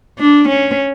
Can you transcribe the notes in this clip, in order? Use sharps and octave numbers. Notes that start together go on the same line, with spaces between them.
D4
C#4